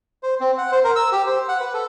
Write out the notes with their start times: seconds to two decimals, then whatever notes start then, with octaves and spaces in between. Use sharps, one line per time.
0.23 C5
0.40 C4
0.58 F#5
0.72 C5
0.84 A#4
0.96 E6
1.12 G4
1.27 C5
1.49 F#5
1.60 B4
1.74 A4